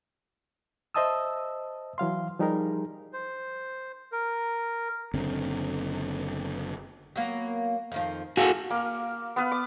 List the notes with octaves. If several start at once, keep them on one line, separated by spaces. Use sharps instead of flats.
C5 D#5 E5 A5 D#6 E6
E3 F#3 F5 C6
F3 G3 D#4 G4 G#4 A#4
C5
A#4
F#1 D3 C4
F#3 A#3 B3
F2 D#3 F3
F4 F#4 G#4 A4
A#3 F5
B3 B4 F5
D6